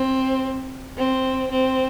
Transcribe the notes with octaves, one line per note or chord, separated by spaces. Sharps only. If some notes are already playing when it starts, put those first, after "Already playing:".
Already playing: C4
C4
C4